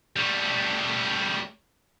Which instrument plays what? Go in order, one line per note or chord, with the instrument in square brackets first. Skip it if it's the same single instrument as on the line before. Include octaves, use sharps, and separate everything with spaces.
[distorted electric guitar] G3 A3